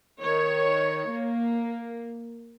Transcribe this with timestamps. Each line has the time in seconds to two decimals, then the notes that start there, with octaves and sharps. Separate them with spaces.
0.21 D#3 C#5
1.10 A#3